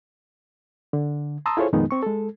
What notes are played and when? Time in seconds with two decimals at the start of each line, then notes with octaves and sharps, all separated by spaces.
0.93 D3
1.46 A5 A#5 C6 D#6 E6
1.57 E4 F4 G#4 A4 C5 C#5
1.73 F2 A#2 D#3 G#3 B3 D#4
1.91 C4 C#6
2.03 G#3 A4